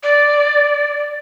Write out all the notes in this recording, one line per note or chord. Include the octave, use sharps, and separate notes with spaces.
D5